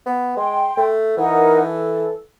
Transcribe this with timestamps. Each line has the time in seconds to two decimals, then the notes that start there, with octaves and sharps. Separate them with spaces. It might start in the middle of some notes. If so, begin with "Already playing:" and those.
0.05 B3
0.36 G#3 G5 C6
0.77 A3
1.17 E3 D#4 A#4 F#5
1.63 A4